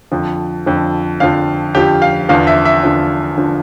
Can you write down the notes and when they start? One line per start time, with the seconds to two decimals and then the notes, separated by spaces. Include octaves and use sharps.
0.12 F2 D3 F3
0.66 F2 D3 F3
1.20 F2 D3 F3 F5
1.75 F2 D3 F3 G4
2.02 F5
2.29 E2 D3 F3 F5
2.47 E5
2.65 E5
2.83 E2 D3 F3
3.37 D3 F3